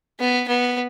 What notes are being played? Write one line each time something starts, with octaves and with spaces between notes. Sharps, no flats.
B3
B3